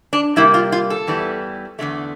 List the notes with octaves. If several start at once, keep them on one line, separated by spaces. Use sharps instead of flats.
D4
C3 G3 A#3 E4
F4
F4
A4
E2 E3 G3
E2 D3 A3